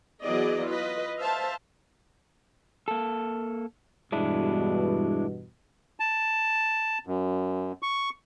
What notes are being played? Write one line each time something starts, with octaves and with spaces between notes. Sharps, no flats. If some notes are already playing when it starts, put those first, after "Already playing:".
E3 F#3 B3 G#4 D5 D#5
F4 B4 D#5
C5 E5 F5 A5
A#3 A4
E2 G2 B2 G#3 D4 E4
A5
F#2
C#6